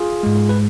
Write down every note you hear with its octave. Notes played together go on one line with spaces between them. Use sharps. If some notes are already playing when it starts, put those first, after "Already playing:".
Already playing: F4 G#4
G#2 G#3
B4